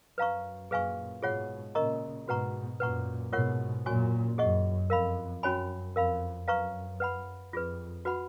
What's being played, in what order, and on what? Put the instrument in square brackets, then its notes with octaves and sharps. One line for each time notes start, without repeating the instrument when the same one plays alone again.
[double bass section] F#2 [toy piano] B4 F5 A#5 C#6
[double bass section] F#2 A#2 [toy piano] G#4 B4 F5 G#5 C#6
[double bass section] G#2 B2 [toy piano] F4 G#4 C#5 F#5
[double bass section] A#2 C#3 [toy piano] A#4 D#5 A#5 C#6
[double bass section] G#2 B2 [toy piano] F#4 B4 F#5 A#5 C#6
[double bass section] F#2 A#2 [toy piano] B4 F#5 A#5 C#6
[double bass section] G#2 B2 [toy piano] F4 A#4 C#5 F#5 C#6
[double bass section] F#2 A#2 [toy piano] F#4 C#5 G#5 C#6
[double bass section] F#2 [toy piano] G#4 D#5 F#5 C#6
[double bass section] F2 [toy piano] A#4 F5 B5
[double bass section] F#2 [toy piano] C#4 F#4 C#5 G#5 B5
[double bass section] F2 [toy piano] A#4 F5 B5
[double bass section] F#2 [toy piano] B4 F5 A#5 C#6
[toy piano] B4 F#5 B5
[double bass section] F2 [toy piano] F4 G#4 B4
[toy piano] F#4 B4 F#5 B5